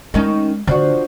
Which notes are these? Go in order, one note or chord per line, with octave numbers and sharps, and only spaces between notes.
D#3 G#3 C#4 D#4
D3 F3 D4 F#4